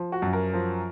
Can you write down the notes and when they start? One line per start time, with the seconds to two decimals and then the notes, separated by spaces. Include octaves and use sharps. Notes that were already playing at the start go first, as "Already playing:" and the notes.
Already playing: F3
0.12 F#4
0.22 F#2
0.33 A#4
0.53 F3